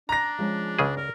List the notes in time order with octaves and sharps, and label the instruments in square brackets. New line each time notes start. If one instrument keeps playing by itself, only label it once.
[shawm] D4 [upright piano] A#5 A#6
[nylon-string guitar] F3 G#3 C#4
[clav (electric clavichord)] C#2 C#3 G#4
[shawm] A#4 [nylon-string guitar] D5